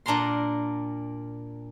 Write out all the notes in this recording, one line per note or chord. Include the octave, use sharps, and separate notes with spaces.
A#2 D4 A#4 A#5 C6